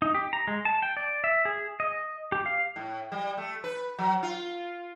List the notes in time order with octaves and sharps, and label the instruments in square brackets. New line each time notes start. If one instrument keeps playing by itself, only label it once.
[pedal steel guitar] D#4
G4
A#5
G#3
A5
G5
D5
E5
G#4
D#5
G4
F5
[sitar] A2
G3
A3
B4
F#3
F4